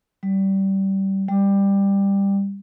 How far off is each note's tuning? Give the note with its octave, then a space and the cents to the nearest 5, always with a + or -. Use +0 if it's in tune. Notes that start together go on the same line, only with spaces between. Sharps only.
G3 -20
G3 +15